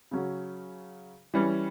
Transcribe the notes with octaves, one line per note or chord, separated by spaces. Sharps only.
C#3 F#3 C#4 F#4
E3 G3 C#4